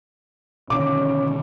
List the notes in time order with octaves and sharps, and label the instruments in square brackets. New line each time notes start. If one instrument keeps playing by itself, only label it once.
[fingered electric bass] B2 D3 D#3 [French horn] C#4 [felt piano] D6